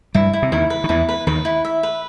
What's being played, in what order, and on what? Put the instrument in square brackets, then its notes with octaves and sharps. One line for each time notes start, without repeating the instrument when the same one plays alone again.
[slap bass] G2 G3 [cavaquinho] E4
[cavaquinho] E4
[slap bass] C3
[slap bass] D#2 D#3 [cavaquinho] E4
[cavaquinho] B4
[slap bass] D#3
[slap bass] E2 E3 [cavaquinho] E4
[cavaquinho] B4
[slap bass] D#2 D#3 [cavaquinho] B4
[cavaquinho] E4
E5
B4